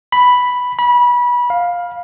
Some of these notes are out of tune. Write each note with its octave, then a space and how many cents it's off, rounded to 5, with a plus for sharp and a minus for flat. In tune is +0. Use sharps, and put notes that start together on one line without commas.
B5 +0
B5 -25
F5 +10